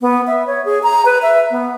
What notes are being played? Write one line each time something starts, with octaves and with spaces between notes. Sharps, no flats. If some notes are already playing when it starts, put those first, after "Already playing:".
B3
E5
C#5
G#4
A#5
B4
E5
B3